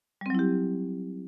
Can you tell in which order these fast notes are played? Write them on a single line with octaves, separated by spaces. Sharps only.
G3 C4 F#3 E4 G4